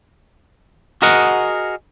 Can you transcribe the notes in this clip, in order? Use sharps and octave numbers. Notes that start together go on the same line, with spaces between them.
F#4 G#4 A#4 D#5 F#5